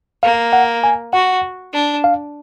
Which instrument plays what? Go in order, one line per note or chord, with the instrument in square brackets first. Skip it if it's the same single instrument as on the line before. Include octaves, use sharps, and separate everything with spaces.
[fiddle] A#3 [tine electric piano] F5
[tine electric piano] F#5
G#5
[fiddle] F#4 [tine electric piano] F#5
[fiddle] D4
[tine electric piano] F5